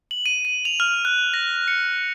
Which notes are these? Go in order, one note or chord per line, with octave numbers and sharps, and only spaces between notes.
F#7
D#7
D#7
F7
F6
F#6
A#6
C#7